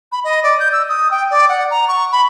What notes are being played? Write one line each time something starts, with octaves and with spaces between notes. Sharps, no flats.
B5
D#5
D5
G6
E6
D#6
G5
D5
F#5
A#5
C#6
B5